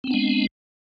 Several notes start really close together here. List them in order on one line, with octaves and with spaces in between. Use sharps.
C4 B3 D4 G#3